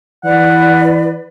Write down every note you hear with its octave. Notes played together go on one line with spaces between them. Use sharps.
E3 B4 D5 F#5